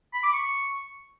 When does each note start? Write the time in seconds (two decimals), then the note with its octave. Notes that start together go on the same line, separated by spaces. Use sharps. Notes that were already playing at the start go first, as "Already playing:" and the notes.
0.14 B5
0.23 D6
0.33 C#6